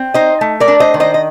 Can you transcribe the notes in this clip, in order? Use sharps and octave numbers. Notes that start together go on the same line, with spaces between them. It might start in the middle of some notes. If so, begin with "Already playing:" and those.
Already playing: C4
D#4 C5 D#5
A3
A#4 D5
D4
C5 D#5
D#3
C5 D#5
D#5